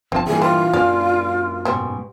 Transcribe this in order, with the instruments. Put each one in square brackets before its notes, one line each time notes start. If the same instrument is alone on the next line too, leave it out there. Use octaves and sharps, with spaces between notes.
[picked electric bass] G1 F3 [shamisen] C4 A5
[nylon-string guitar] G2 A#2 [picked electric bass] E3 [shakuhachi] G#4
[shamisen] G3 C5 [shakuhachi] F4
[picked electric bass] F#2 A#2 [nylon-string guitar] D4 G#4 F5 [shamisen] D5
[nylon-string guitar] G#2 B2 [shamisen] G3 C5